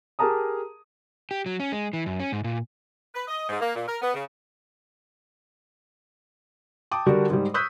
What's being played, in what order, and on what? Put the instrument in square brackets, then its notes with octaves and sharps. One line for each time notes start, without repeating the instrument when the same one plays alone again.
[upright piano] G4 G#4 A#4 A5 A#5 D#6
[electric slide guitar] G4
F#3
C#4
G#3
E3
F#2
C#4
G#2
A#2
[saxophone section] B4
D#5
G#2
A#3
A#2
A#4
B3
C#3
[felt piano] G5 A5 D6 D#6
D3 G3 D4 F#4 G4 A#4
G#2 G3
C#6 D#6 E6 F#6 G6 B6